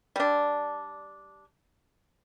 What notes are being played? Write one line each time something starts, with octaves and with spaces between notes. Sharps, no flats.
G3 D4